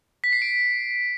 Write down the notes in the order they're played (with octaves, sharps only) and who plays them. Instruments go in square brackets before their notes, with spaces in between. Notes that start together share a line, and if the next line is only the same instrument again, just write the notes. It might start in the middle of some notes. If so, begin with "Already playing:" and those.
[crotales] B6
C7
D7